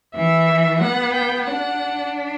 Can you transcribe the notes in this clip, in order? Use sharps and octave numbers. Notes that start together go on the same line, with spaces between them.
E3 E5
B3 F#5
G5
D4 F#5